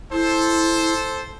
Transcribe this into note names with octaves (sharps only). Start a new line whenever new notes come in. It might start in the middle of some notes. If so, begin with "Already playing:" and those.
E4 A4 C5